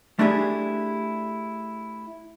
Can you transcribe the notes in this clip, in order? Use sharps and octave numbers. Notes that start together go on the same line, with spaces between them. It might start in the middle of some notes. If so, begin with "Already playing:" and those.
A3 D4 E4 G4 G#4